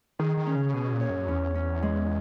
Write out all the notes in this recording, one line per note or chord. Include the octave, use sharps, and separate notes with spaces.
D#3 G#4
D#3
C#4
C#3
B2 G#4
A#2
C#5
F#2
E2 C#4
C#4
G#3